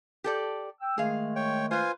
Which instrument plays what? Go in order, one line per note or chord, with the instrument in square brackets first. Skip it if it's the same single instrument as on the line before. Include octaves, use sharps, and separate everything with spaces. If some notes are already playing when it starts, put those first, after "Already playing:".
[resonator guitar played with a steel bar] G4 A4 D5
[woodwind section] G5 E6
[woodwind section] D#3 G#3 A3 [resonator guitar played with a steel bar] G#4 F5
[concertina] C#5 G5
[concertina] F4 G#5 [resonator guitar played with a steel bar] B4 C5